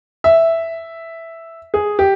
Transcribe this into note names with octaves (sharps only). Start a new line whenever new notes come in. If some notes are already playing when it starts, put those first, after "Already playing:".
E5
G#4
G4